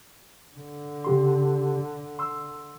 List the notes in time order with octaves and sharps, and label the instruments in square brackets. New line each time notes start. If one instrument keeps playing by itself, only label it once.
[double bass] D3
[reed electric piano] C#3 G4 C6
C6 E6